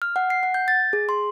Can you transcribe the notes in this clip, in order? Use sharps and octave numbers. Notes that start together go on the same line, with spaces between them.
F6
F#5
C7
F#5
G6
A6
G#4
C6